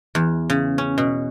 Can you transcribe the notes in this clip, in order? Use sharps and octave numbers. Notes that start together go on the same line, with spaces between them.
E2
C#3
C#4
B2